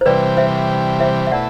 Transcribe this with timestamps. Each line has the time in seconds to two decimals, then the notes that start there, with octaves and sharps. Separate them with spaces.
0.01 C5
0.06 C3 E3 G3 B4 D5
0.37 C5 E5
1.00 C5 E5
1.27 E5
1.32 B2 A3 E4 D5 F#5